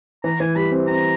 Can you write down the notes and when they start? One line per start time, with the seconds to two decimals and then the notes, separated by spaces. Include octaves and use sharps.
0.24 E3 A#5
0.40 E3 G#5
0.56 G3 B5
0.71 C4
0.88 C4 A#5